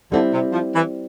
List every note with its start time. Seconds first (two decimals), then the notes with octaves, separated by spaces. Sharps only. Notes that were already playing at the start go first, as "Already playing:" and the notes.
0.12 D3 G3 C4 E4
0.32 C3
0.52 F3
0.74 E3